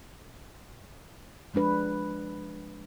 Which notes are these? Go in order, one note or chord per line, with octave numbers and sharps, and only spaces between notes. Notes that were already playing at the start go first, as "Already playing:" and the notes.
F3 G#3 D4 B4